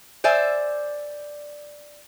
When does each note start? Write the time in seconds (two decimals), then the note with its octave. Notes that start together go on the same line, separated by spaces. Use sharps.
0.24 C5 D5 E5 G#5